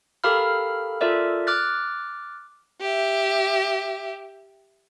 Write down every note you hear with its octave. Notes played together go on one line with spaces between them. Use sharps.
G4 A4 A#4 F5 B5 F6
F4 A4 A#4 D5 E5
D6 F6 F#6 A6
G4 E5